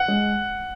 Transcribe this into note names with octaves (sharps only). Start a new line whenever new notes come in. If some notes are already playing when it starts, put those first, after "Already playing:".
Already playing: F#5
G#3